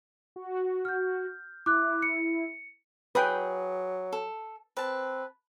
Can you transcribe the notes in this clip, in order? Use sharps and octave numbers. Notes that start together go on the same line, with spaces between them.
F#4
F6 G6
E4 D6 F#6
C#7
F#3 G#4 B4 G5 B5 D#6
A4
C4 B4 A5